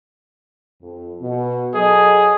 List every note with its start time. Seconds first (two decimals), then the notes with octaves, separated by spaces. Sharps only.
0.82 F2
1.21 B2
1.75 F#3 G#4 A4 D#5